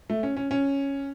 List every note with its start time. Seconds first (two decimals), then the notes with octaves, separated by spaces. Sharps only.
0.10 A3
0.23 C#4
0.37 C#4
0.51 C#4